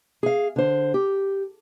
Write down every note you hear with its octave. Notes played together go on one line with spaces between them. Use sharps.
G#4 F5
D3 C5
G4